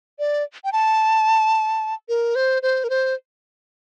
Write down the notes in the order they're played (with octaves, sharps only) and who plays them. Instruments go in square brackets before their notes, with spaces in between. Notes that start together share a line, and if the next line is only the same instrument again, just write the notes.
[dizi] D5
G5
A5
A#4
C5
C5
A#4
C5